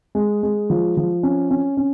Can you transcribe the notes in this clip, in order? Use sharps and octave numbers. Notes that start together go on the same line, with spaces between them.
G#3
G#3
F3
F3
C#4
C#4
C#4